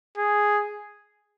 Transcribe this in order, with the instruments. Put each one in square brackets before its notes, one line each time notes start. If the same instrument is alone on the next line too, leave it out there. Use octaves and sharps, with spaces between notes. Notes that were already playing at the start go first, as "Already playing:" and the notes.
[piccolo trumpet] G#4